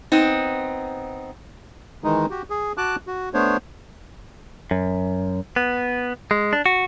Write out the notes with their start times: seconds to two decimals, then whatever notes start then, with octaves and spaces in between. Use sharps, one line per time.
0.12 B3 C4 D#4
2.04 D#3 E3 G#3 D#4
2.30 F#4 G4
2.50 G#4
2.77 F#4 A5 D6 F#6
3.07 F#4
3.34 A3 B3 D4 C5 C#5
4.71 F#2
5.56 B3
6.31 G#3
6.53 D4
6.66 F#4